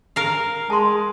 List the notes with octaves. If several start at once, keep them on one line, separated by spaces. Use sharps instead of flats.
A#4 F5
G#3 A5 C6